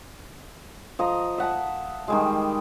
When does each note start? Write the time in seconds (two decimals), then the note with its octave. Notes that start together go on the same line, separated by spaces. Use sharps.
0.99 F3 D#5 A#5
1.38 E5 F#5 A5
2.08 D#3 G3 G#3